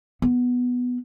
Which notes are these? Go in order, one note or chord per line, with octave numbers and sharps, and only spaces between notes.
B3